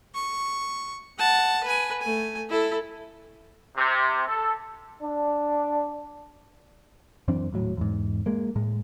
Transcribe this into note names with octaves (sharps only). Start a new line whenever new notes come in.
C#6
F#5 A5
B4 G#5
A3 G#5
E4 A4
C3
A4
D4
F#2 E3 C4 D4
D#1 A2 F#3
E2 G#2
G#3 A#3
A2 G#3